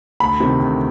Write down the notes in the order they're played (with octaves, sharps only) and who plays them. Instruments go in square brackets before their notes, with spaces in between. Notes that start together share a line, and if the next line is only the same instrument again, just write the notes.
[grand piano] D2 B5
C3 D#3
D2